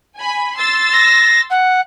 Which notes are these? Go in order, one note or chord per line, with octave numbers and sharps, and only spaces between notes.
G#5 B5
C6 E6 A6
A#6
F#5